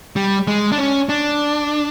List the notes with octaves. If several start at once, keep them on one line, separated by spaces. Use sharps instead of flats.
G3
G#3
D4
C#4
D4